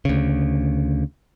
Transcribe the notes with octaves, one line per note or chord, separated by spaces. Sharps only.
D2 C#3